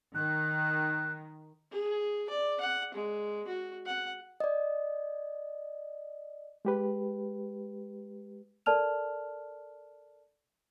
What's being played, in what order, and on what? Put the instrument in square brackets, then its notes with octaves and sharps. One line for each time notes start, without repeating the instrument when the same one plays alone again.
[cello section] D#3 [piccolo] F#6
[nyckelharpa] G#4
D5
F#5
G#3
F#4
F#5
[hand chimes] D5 D#5
[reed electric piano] G#3 G4 B4
[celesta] A4 A#4 D5 A5 F6 F7